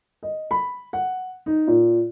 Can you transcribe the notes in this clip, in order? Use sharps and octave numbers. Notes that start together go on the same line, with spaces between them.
D#5
B5
F#5
D#4
A#2